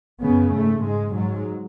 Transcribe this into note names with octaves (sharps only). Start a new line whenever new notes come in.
F#2 C#3 B3
G#2 A3
G#2 G#3
G#2 F#3